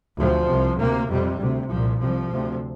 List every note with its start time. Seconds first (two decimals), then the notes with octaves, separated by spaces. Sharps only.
0.17 D2 C3 F3
0.48 C2 C3
0.78 D2 C3 A#3
1.09 F2 C3 G3
1.40 D2 C3
1.69 C2 A#2 F3
1.99 C2 C3 F3
2.29 D2 C3